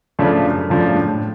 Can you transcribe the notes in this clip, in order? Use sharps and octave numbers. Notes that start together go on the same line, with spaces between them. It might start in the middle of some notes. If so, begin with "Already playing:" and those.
C#3 F3 A3 D4
F#2
C#3 F3 A3 D4
A2